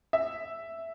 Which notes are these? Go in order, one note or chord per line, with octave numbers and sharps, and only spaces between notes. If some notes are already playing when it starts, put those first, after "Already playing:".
E5